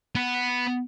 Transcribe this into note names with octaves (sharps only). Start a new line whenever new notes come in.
B3